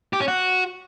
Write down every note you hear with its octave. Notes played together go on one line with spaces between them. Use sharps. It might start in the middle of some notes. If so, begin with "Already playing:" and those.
G4
C#4
F#4